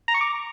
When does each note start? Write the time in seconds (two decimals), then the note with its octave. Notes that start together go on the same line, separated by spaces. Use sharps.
0.08 A#5
0.14 C#6
0.21 D6